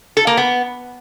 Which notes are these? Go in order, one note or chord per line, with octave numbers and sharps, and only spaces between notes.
A4
A#3
B3